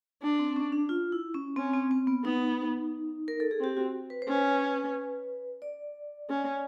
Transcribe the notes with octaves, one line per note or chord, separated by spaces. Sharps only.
D4
C4
C#4
D4
F4
E4
C#4
C4 C#4
C4
C4
B3
B3 D#4
A#4
A4
G#4
C4 G4
F#4
B4
C5
C#4
B4
D5
C#4